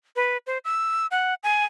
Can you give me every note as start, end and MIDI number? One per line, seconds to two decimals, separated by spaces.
0.16 0.37 71
0.47 0.58 72
0.65 1.07 88
1.11 1.34 78
1.43 1.65 80